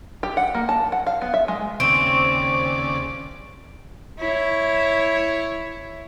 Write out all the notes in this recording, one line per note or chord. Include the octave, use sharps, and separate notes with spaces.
G4
F#5
A#3
A5
F#5
F5
B3
E5
G#3
D#2 C#3 C4 D5 C#6 D7
E4 C#5